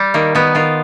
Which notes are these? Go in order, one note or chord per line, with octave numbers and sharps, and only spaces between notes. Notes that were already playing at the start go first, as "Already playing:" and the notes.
Already playing: G3
D#3 A#3
D#3 B3
D#3 F4